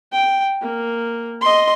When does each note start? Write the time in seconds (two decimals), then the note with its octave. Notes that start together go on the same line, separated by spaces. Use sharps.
0.12 G5
0.62 A#3
1.41 D#5 C6